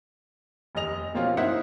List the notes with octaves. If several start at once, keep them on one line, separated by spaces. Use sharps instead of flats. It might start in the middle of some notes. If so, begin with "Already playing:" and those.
F1 D#2 D#5 F7
B2 F3 A#3 C4 C#4 F4
A#3 D#4 E4 C5 E5 F#5